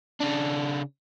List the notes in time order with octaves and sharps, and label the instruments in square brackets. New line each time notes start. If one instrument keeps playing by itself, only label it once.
[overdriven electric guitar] C#3 D4